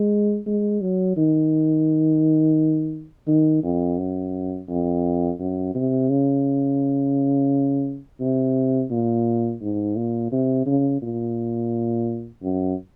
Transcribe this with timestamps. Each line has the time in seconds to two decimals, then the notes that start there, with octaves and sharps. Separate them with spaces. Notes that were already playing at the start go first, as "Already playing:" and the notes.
Already playing: G#3
0.47 G#3
0.81 F#3
1.17 D#3
3.27 D#3
3.63 F2
3.98 F#2
4.69 F2
5.39 F#2
5.75 C3
6.09 C#3
8.20 C3
8.91 A#2
9.61 G#2
9.96 A#2
10.32 C3
10.66 C#3
11.02 A#2
12.43 F#2